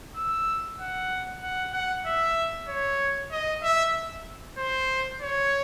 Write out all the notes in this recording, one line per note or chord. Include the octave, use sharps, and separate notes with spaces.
E6
F#5
F#5
F#5
E5
C#5
D#5
E5
C5
C#5